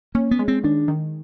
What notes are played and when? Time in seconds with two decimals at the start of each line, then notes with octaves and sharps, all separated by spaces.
0.15 A#3 C#4
0.31 B3
0.39 G#3
0.48 C4
0.63 D#3 D4
0.88 D#3